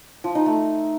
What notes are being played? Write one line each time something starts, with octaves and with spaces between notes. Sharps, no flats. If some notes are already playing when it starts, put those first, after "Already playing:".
F3
D#4
A3